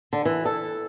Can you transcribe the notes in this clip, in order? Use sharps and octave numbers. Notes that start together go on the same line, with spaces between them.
D3
E3
A4